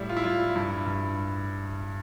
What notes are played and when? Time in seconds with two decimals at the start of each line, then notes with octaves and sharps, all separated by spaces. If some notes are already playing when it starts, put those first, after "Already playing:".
Already playing: A2 G3 E4
0.09 F4
0.17 E4
0.24 G3 F4
0.56 G2 E4
0.86 G2